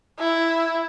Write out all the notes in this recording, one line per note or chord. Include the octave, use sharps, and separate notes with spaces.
E4